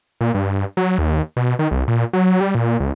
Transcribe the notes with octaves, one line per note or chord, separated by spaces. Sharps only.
A#2
G2
F#3
D#2
B2
D#3
C2
A#2
F#3
G3
A#2
C#2